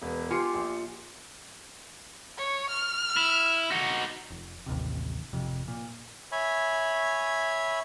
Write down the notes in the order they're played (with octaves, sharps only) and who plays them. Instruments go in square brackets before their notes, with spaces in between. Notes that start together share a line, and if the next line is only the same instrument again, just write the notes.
[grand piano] E1 B4
[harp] F4 [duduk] G4 [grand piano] G#5 C6 C#7
[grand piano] A#1
[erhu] C#5
F6
[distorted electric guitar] E4
D#4 F#4
[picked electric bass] F1
A1 D#2 C3
G#1 F2 C3
A#2
[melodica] C#5 E5 G#5 B5